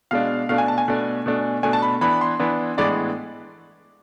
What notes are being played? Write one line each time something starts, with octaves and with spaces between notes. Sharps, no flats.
B2 G#3 D4 F5
B2 A3 D4 F5
G#5
A5
G#5
B2 A3 D4
B2 A3 D4
B2 A3 D4 G#5
A5
B5
E3 B3 D4 B5
C6
E3 B3 D4
A2 E3 G#3 B3 D4 D5